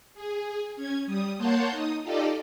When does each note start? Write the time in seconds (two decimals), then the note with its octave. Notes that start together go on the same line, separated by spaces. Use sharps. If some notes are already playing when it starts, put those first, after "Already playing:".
0.15 G#4
0.76 C#4 G#6
1.05 G3 D#6
1.38 A#3 C#5 F#5 A5 C6 G6
1.71 D#4 D#6
2.02 D#4 F4 G4 A4 D5 D#5